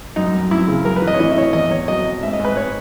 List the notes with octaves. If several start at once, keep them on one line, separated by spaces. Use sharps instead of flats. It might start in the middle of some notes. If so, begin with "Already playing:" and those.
F#2 D#4
F#2
F#2 E4
C#3
F#2 A#4
B4
E3
D#5
C#5
E3 D#5
E5
E3 C#5
D#5
E2 D#5
E2 C#5
F#3 D#5
B2
G#2 E5
D#5
G#2
B4
C#5